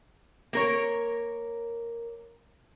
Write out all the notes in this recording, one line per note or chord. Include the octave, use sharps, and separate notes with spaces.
A#3 A#4 C#5